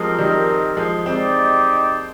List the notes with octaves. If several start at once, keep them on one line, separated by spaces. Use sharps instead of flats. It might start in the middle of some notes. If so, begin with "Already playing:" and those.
Already playing: F3 G#3 C4 D#4 G4 A#4 D#5
D#3 G3
F3 G#3
G#3 C4 D#4 G4 D5